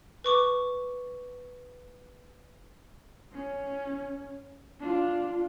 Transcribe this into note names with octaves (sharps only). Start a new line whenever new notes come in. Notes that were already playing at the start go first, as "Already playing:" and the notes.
B4 C#6 D6
C#4
D4 F4